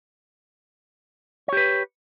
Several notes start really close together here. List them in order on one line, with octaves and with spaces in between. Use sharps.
C#5 G4 B4